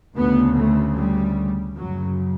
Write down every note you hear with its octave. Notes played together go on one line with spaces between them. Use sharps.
D2 C#3 B3
A3
G3
F#2 C#3 F#3